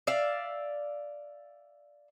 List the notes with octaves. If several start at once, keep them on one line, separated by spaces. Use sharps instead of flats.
D5 E5 F5